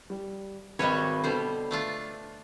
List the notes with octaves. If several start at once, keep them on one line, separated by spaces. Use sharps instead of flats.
G3
G#1 G3 F#4 B4 C#5 D#5
B2 D3 G3 C5
A3 D4 F4